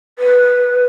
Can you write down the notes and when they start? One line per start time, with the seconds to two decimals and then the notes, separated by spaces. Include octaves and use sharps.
0.19 B4